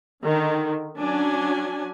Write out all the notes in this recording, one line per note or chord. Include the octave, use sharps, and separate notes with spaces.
D3 D#3
F#3 C#4 D4 G#5